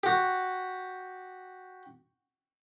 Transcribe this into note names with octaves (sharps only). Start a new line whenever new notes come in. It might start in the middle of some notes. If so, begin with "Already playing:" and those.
F#4 G4